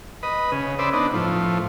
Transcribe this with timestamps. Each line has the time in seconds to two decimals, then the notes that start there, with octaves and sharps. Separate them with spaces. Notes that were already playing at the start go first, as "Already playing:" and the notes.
0.23 B4 D#5
0.52 C#3
0.79 B4 C5 D5 E5
0.93 B3 D4 D#4
1.14 A2 F3